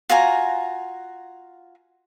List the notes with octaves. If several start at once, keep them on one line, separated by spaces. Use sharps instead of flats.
F4 F#4 G#5 A#5